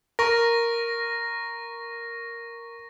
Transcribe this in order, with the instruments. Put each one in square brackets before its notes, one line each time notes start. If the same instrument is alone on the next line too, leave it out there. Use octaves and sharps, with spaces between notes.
[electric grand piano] A#4 [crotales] C#6 A#6